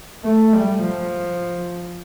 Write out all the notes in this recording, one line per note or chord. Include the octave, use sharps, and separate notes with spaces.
A3
G3
F3